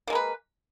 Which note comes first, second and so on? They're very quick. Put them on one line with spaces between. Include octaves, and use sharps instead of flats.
A#3 G#3 A#4 B4